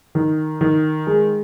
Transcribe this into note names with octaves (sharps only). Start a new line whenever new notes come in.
D#3
D#3
G#3